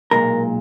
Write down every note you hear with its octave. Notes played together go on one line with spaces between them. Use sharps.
B1 A#2 G#3 A#4